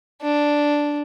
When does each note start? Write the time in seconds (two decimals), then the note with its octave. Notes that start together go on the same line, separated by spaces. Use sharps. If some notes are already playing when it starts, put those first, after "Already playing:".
0.22 D4